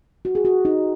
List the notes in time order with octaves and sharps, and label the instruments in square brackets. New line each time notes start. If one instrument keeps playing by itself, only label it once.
[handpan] F#4
G#4
F#4
D#4